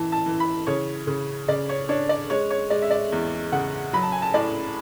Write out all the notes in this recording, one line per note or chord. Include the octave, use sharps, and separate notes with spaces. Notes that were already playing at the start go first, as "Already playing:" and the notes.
Already playing: E3 A5
A5
E3
B5
C#3 C#5
C#3
C#3 D5
C#5
D4 C#5
D5
G#3 C#5
C#5
G#3 D5
E5
D5
E2
C#3 F#5
F#3 B5
A5
G#5
A5
A2 D5